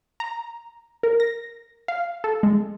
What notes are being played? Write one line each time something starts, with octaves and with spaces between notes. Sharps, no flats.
A#5
A#4
A#6
F5
A4
G#3